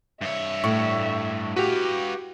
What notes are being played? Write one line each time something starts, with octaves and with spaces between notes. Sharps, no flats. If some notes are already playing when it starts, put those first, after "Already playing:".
G2 C#5 E5
A2 C#6
F#4 G4 B4 F5